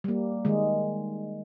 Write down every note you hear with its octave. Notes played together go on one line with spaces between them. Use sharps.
G3 A#3
D#3 G#3